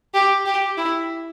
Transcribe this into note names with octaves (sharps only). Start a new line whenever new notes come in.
G4
G4
E4